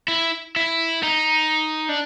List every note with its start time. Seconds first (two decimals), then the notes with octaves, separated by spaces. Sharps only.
0.08 E4
0.56 E4
1.03 D#4
1.89 D4